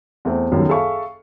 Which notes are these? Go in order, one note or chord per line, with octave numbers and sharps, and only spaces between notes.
E2 A3 C4
G1 C#2 F#2 D#3
G#4 A4 E5 F5 B5 C#6